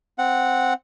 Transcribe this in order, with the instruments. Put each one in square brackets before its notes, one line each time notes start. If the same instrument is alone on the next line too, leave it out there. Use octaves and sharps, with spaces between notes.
[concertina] C4 F#5